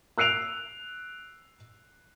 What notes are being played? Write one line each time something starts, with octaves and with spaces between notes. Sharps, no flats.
E6 F#6 C7 D7 F7